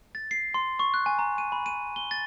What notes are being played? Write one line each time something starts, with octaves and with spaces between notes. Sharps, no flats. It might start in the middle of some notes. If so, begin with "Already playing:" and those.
A6
C7
C6
C#6
F#6
G#5
A#5
D#7
B5
D#7
G7
A6